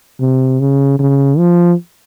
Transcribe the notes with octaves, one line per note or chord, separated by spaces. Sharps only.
C3
C#3
C#3
F3